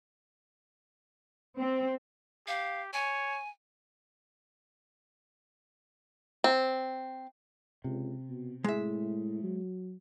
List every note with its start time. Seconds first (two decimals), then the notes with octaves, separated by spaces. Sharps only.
1.57 C4
2.48 G4 F5
2.93 C#5 G#5
6.44 C4
7.84 C#2 C3
8.29 B2
8.64 A2 G#3 E5
9.43 F#3